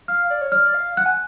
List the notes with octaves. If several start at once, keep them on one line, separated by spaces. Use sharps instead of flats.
F5 F6
D5
C#5
D5 F6
D5
F5
F#5 F#6
G#5